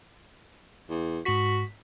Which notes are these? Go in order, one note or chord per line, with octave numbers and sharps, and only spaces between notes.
E2
G#2 F#4 B6